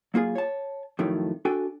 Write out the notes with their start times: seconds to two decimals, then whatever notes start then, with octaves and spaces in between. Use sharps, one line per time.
0.14 F#3 A#3 F4 G#4
0.35 C#5 A5
0.99 F2 A2 D#3 F#3 A3
1.45 D4 F#4 A4 G5 G#5